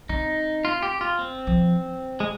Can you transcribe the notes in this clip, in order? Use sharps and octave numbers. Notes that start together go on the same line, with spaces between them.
C4 D#4
F4
G4
F4
C4
F3
G#3